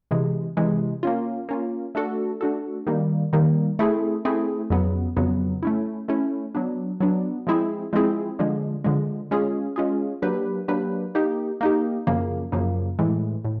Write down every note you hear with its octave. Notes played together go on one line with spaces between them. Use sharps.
C3 E3 G#3
C3 E3 G#3
A#3 C#4 F4
A#3 C#4 F4
A3 D4 F#4 A4
A3 D4 F#4 A4
D#3 G3 A#3
D#3 G3 A#3
A3 C4 E4 G#4
A3 C4 E4 G#4
F2 C#3 F#3 B3
F2 C#3 F#3 B3
A3 C#4 E4
A3 C#4 E4
F#3 B3 D4
F#3 B3 D4
F3 G#3 C4 E4 G#4
F3 G#3 C4 E4 G#4
D3 F3 G#3
D3 F3 G#3
G#3 C#4 F4 G#4
G#3 C#4 F4 G#4
F#3 A#3 D4 G4 B4
F#3 A#3 D4 G4 B4
A#3 D#4 G4
A#3 D#4 G4
F#2 C#3 F3 A#3
F#2 C#3 F3 A#3
A2 E3 G#3
A2